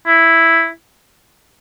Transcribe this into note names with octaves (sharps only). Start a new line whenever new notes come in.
E4